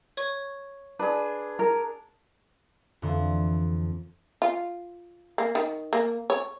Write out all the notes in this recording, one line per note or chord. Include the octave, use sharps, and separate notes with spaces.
C#5 C#6
D4 G#4 B4
A#4
F2 D3 E3 C6
F4
A#3
D#3
A#3
C#5